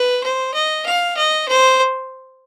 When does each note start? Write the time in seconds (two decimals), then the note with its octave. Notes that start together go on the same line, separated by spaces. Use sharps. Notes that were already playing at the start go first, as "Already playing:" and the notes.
Already playing: B4
0.23 C5
0.54 D#5
0.86 F5
1.17 D#5
1.48 C5